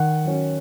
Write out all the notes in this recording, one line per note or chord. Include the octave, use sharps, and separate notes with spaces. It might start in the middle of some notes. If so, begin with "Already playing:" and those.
Already playing: D#3 F#5
F#3 C#4